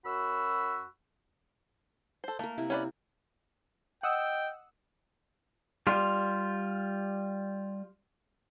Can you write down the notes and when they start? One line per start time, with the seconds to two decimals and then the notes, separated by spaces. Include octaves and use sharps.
0.05 F#2 F#4 B5 E6
2.24 A4 C5
2.39 A3 A#3 A#4
2.58 C3 E4
2.70 C#4 B4 D5
4.03 D#5 F#5 G5 D#6 E6
5.87 G3 F4